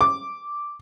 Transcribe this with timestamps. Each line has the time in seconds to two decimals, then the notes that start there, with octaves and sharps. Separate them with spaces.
0.01 D6